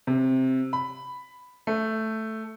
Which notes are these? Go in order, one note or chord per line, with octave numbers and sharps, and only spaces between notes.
C3
B5
A3